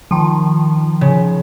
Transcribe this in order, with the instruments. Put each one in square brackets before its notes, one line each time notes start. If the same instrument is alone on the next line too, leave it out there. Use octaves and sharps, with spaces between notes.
[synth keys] D#3 F3
[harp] C#3